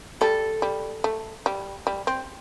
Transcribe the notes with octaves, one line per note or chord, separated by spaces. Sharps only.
G3 A4
G3
A3
G3
G3
C4